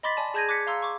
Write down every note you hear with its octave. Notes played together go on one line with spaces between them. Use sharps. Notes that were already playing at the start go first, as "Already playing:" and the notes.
D#5 B5 C6 D6 A6 B6
D5 G#5 A5
G#4 A5 G6 G#6 A#6 D#7
D6 F#6 G#6 B6 C#7
F5 A#5 C6 E6
C#6 D6